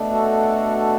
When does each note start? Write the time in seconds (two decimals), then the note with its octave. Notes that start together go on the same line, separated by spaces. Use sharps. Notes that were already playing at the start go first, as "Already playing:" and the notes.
Already playing: B2 A3 D4
0.11 F#4 A4